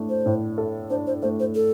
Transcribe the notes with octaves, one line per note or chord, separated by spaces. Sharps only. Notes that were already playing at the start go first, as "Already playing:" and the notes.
Already playing: A2 A3 D4 A4
C5
A2
A4
D4 C5
C5
A3 C5
C5
A4